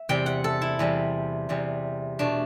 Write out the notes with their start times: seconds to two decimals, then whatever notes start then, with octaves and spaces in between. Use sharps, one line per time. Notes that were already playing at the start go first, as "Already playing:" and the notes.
Already playing: E5
0.09 E2 C3 G3 G5
0.26 F#5
0.44 A4
0.62 E4
0.79 E2 C3 G3
1.49 E2 C3 G3
2.19 B2 A3 D4